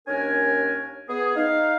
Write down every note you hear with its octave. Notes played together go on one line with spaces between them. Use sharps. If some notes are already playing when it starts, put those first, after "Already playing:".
D#2 C#4 D4 A#4 G#5
B3 G#4
D#4 F5